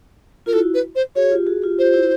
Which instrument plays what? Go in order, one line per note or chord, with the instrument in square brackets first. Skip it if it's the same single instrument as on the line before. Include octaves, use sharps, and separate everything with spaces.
[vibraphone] F4 [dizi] A#4
[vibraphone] E4 F#4 [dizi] A4
[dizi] B4
C5
[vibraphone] F#4 G#4 [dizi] C#5
[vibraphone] F4 G4
F#4 G#4
F4 G4
[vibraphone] F4 G4 [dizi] C5
[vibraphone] E4 F#4